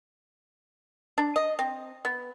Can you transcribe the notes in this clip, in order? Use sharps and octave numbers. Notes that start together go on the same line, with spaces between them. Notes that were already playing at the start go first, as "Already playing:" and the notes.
D4
D#5
C4
B3